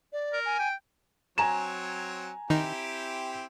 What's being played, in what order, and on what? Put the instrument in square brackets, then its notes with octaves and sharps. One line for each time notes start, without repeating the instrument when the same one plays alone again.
[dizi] D5
[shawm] A#4
[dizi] G#5
[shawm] G5
[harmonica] F#3 C4 C#5 [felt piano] G#5 A#5 E7
[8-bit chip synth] D#3 D#4 [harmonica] C4 E4 G4